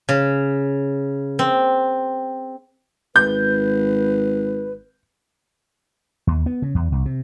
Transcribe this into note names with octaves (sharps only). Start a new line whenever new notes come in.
C#3
C4
G#1 B4 G6
D#2
B3
C#3
E2
C2
C3